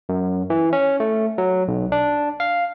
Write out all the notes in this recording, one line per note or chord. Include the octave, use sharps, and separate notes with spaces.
F#2
E3
C#4
A3
F#3
B1
D4
F5